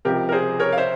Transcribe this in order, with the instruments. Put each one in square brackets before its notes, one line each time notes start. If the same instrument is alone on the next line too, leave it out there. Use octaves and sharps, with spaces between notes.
[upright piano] C#2 C3 F3 G4 A#4
A#4
G#4 C5
A#4 C#5
F5
C5 E5